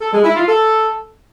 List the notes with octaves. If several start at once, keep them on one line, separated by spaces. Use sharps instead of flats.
A4
G#3
E4
F4
A4